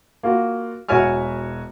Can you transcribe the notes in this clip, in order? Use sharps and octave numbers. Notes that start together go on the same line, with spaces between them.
A#3 F4 F#4
E1 F#4 C#5 E5 G#5 F6